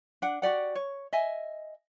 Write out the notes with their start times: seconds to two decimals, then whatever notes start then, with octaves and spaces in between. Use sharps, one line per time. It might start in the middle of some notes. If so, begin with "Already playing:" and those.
0.22 D4 F#5
0.42 F#4 G4 D5 F#5
0.75 C#5
1.13 D#5 E5 G#5